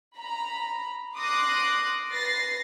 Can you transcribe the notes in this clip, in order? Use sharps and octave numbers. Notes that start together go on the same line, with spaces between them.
A#5 B5
C6 D6 D#6 F#6 A#6
B4 A6 A#6 C7